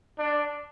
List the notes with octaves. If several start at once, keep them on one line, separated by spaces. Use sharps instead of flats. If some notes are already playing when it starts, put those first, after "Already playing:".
D4